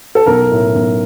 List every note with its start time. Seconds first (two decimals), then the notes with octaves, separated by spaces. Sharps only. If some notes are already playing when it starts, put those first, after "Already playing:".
0.15 A4
0.26 B1 A#4
0.51 A2
0.75 B1